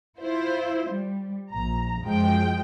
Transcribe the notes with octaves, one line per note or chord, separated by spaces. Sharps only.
E4 F4 C5
G3
A#1 A#5
F#2 F3 G#3 G5